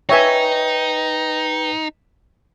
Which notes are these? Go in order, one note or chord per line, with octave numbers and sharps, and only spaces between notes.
D#4 B4 C#5 E5 G5 G#5